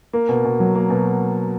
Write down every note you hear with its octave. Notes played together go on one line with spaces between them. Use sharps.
A#3
B2
B2
F#3
A#3
B2